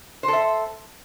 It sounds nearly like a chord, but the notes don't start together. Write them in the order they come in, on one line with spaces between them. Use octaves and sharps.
C5 A4 E5